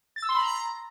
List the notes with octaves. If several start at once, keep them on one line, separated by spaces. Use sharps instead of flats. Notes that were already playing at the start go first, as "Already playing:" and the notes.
A6
E6
C6
B5
A#5